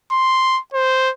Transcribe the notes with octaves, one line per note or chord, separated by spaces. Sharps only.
C6
C5